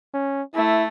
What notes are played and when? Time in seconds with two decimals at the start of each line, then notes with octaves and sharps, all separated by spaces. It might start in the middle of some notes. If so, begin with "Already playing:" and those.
0.14 C#4
0.55 A3 E4